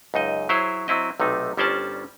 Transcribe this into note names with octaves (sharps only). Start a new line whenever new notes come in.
C#2 F#2 D#4 D#5
F#3 E4 G#4 C5 C#5
F#3 C4 E4 D#5
B1 C3 A3 D#4
G1 G3 C#4 C5 D5 A5